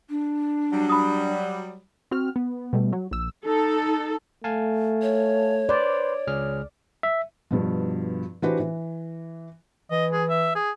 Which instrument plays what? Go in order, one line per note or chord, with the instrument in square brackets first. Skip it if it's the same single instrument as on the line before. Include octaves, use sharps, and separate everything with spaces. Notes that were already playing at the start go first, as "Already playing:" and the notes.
[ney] D4
[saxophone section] F#3 G3
[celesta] B5 D#6
[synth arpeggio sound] C4 F#4 F6
B3
B2 G3 A3
F#3
A#1 E6
[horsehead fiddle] D#4 [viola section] A4
[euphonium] A3 [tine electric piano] F5 G#5 A5
[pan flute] C#5
[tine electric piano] B4 C5 [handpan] D5
[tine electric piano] C#2 G#4 F6
E5
[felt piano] G2 B2 F3
E3 D4 F#4 G4 B4 C5
E3
[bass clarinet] E3 [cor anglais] D#5
[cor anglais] G#4
E5
G#4